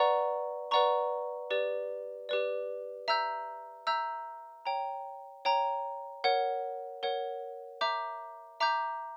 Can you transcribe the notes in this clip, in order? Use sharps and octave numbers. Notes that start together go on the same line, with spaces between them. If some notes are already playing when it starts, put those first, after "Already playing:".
Already playing: B4 D5 F#5 A#5 C#6
B4 D5 F#5 A#5 C#6
G4 B4 D5
G4 B4 D5
E5 A#5 E6 G6
E5 A#5 E6 G6
C#5 G5 A#5
C#5 G5 A#5
A#4 C#5 F#5
A#4 C#5 F#5
E5 A#5 D6 G6
E5 A#5 D6 G6